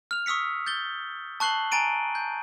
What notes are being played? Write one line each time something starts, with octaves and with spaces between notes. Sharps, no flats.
F6 F7
C#6 D#6 E6 B6 C#7
G6 A6 G7
A5 C#6 F#6 C7 F#7 G7
G#5 A#5 A6 D7 D#7
G6